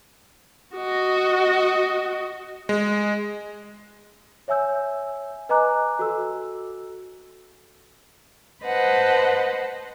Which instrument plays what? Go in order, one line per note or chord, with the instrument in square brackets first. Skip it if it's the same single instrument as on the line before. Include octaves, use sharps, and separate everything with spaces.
[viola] F#4 D#5
[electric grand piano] G#3
[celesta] C#5 E5 G#5 E6 G6
B4 D#5 G#5 A#5 D6 F#6
F#4 A4 E6
[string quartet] B4 C5 D#5 F#5 A5